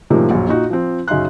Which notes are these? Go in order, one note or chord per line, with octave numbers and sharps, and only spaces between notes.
A2 C3 D#3 F3 G#3 A#3
A#1 F#2
A#2 D#4 F#4
F3 C4
F#2 C#3 D#4 E5 C6 F#6